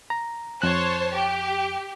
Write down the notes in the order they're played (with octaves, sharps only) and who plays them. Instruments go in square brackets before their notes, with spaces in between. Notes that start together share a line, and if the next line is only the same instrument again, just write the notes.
[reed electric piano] A#5
[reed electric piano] F2 F#6 [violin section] C5 C#5 A5
[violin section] G4